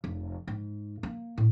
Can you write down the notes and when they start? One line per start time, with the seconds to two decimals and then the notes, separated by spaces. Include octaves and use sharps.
0.04 F1
0.47 G#2
1.03 A#3
1.38 A2